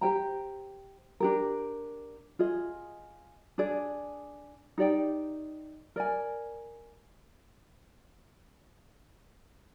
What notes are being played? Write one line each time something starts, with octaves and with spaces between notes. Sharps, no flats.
G4 C5 G5 A#5
D4 G4 A#4
F4 G#4 D#5
D4 G#4 D5
D#4 G4 D5 G5
A#4 D5 G#5